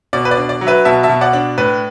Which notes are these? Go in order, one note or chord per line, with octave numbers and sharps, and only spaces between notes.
B2 D5
B4
D5
D4
D5
F#3
B4 E5
B2 E5 A5
E5 A5
B2
D5 F#5
D4
A2 B4